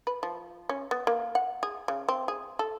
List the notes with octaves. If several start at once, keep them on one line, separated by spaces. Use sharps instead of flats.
B4
F3
C#4
B3
A#3
F#5
G#4
C#3
C4
G#4
A4